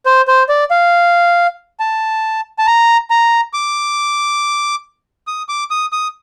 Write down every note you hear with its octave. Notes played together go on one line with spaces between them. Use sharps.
C5
C5
D5
F5
A5
A5
A#5
A#5
D6
D#6
D6
D#6
D#6